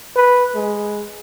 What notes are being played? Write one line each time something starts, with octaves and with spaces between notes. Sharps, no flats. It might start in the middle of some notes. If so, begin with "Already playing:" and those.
B4
G#3